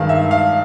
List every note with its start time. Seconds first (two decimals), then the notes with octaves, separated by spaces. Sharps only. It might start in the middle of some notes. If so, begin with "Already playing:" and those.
Already playing: G2 D#3 G#3 F5
0.09 E5
0.31 F5